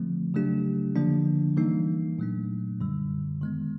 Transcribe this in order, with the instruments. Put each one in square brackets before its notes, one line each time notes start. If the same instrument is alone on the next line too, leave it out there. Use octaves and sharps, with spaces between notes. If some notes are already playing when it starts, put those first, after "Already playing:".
Already playing: [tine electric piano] D3 F3 A3 C4
C#3 F#3 A3 D4 G4
D3 F3 A#3 D4
E3 G3 A#3 D#4
A#2 F#3 A3 D4
F#2 D3 G3
D#3 G#3 B3